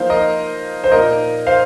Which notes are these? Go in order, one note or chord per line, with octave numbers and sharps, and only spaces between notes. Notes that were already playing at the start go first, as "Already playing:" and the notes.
Already playing: F3 A#3 D#4 C5 F5
A#4 D#5
C5
A#2 A#3 D#4 A#4 D#5
C5 F5